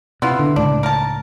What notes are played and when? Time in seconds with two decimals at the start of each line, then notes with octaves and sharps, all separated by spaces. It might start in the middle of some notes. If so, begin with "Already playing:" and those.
0.22 C3 B3 E4 F4
0.39 D3
0.56 C#2 A2 D4
0.83 A#4 A5